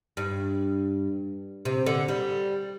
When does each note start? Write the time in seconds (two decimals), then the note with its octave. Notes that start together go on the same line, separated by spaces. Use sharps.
0.17 G2
1.65 C3
1.86 D3
2.08 G3